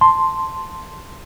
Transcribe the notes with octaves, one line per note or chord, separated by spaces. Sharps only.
A5 C6